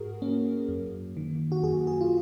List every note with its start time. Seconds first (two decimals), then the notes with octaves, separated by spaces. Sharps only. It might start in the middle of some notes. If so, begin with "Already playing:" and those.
Already playing: G#2 F#4 G#4 A#4
0.22 A#3 C#4
0.69 F#2
1.17 D#3
1.52 F#4
1.63 F#2 G#4
1.87 G#4
2.01 F4